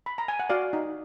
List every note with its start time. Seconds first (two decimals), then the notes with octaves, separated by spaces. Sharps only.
0.06 B5
0.18 A#5
0.28 G#5
0.40 F#5
0.50 F#4 D5 F5
0.73 D#4